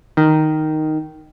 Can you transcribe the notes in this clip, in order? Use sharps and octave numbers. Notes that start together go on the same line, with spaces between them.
D#3